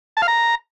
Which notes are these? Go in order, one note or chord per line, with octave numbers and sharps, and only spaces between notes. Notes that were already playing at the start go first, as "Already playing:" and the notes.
A5
F5
A#5